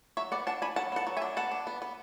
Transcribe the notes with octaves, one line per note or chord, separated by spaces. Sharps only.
F#3 C#5 E5
B3 D5 F#5
D4 F#5 A5
D4 G#5 B5
F#3 F#5 A5
B3 F#5 A5
F#3
E5 G#5
D4
B3 F#5 A5
D4
B3
B3